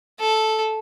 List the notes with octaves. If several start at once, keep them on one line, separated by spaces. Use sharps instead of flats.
A4